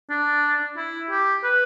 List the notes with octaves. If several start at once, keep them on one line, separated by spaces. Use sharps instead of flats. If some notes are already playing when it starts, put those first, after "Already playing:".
D4
E4
G4
B4